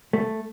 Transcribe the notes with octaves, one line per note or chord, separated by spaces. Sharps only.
A3